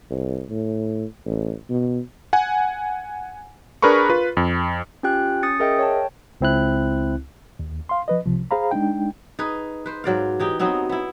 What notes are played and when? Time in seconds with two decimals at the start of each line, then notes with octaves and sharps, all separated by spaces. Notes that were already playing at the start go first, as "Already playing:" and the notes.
0.10 C2
0.50 A2
1.26 A1
1.69 B2
2.33 F#5 G#5
3.82 D4 G#4 A#4 B4 B5 C#6
4.09 F4 B4
4.37 F2
5.03 C#4 F4 G4 G5 F#6
5.43 C#4 D#6 A6 C#7
5.60 G#4 A#4 D#5 E5 G5
5.79 C#5 G5 A5
6.41 C#2 C4 E4 F#6
7.59 D#2
7.89 F5 C6
8.08 F3 B4 D#5
8.26 C2 C3 F3
8.51 G#4 C5 F5 A#5 B5
8.71 G#3 D4 D#4 G5
9.39 D#4 G#4 B4
9.86 B4 C5
10.04 G#2 F#3 D5 F5
10.39 E3 D#4 G4 G5
10.59 F#3 B3 C4 D#4
10.89 B3 E4